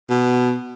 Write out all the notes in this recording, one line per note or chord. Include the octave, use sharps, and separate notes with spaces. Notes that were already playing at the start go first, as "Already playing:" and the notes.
B2